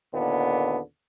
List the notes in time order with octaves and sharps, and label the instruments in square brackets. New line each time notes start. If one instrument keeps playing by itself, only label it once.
[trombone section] D#2 A#2 D3 B3